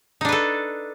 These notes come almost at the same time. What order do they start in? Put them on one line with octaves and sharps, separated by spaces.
D#4 D4 B4 A4